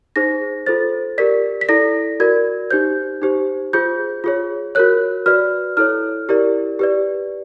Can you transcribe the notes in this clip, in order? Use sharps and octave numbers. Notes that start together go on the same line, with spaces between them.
D#4 G#4 C5 A#6
F4 A4 C5 A6
G4 A#4 D5 B6
B6
E4 A4 D5 A#6
F#4 A#4 D5 G#6
D#4 G4 C5 G6
D#4 G4 C5
F4 G#4 C5 G6
F4 G#4 C#5
F#4 A#4 C#5 F#6
F#4 B4 D5 F6
E4 A4 C#5 F6
E4 G4 A#4 D5
G4 B4 D5